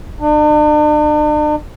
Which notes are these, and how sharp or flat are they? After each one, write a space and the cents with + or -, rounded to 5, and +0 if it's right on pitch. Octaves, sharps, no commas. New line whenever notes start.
D4 +40